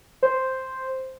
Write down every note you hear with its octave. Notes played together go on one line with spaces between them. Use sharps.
C5